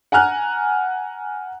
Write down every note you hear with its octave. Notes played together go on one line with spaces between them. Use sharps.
F#5 G#5 A#5 F6 F#6